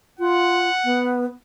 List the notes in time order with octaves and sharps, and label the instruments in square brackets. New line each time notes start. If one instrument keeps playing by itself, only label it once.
[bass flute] F4 [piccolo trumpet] F#5
[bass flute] B3